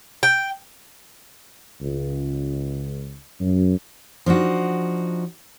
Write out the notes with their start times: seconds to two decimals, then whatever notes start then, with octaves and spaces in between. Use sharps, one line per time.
0.23 G5
1.81 C#2
3.39 F#2
4.26 F3 D4 D#4 F#4